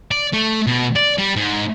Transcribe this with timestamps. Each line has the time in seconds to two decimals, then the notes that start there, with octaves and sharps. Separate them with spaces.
0.11 D5
0.33 A3
0.67 B2
0.96 D5
1.18 G3
1.36 G#2